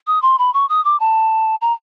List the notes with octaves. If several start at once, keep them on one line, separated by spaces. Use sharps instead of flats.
D#6
C6
B5
C#6
D#6
D6
A5
A#5